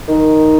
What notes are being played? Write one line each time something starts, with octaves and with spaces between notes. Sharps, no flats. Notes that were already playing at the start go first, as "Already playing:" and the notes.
D#3